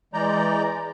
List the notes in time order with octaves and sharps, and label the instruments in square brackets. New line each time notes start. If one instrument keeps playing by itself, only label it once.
[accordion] E3 G#3 D5 A#5 G6